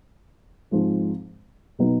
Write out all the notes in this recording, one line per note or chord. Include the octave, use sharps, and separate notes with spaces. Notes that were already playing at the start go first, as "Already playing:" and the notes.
G#2 F3 G#3 C4
B2 F#3 B3 D#4